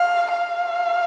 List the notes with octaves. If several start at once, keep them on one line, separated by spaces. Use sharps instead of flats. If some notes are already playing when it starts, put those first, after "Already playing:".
Already playing: F5
F5